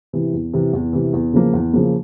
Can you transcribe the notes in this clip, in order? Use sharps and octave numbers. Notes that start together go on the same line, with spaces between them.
C3 E3
E2
C3 E3
E2
C3 E3
E2
C#3 F3 A#3
E2
C#3 F3 A#3